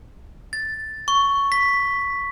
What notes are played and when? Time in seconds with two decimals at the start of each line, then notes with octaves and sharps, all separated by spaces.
0.53 A6
1.08 C#6
1.52 B6